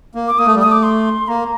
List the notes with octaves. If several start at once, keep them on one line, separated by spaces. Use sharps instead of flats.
A#3
D6
A#3 D#6
A3
G3
A3 D#6
D6
C6
A#3 A#5